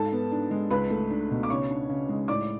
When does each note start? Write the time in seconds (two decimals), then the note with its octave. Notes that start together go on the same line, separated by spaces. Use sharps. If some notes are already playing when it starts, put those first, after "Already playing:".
Already playing: G#2 A4 A5
0.12 B3
0.32 D4
0.51 G#3
0.70 C#2 B4 B5
0.90 A3
1.10 D4
1.31 B2
1.43 D6
1.50 C#3 C#5 C#6
1.70 D4
1.89 C#3
2.09 G#3
2.28 A2 D5 D6